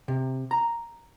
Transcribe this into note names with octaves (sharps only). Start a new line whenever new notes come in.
C3
A#5